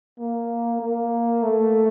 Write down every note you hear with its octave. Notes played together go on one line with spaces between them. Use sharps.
A#3
A#3
A3